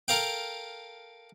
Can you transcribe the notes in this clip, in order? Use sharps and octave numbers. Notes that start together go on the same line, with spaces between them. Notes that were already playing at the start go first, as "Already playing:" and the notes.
A4 A#4 F5 G5